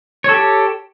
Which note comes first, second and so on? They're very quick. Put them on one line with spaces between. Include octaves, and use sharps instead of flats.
C#5 A4 G4